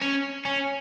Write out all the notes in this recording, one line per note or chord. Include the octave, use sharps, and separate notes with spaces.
C#4
C#4